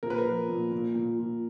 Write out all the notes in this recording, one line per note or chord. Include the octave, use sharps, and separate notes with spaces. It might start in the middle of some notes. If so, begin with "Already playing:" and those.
A#2 A#4
B4
A#4
F3
A#2
A#2
A#2
A#2